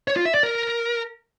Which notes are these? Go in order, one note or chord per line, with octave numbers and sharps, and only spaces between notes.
C#5
F4
E5
D5
A#4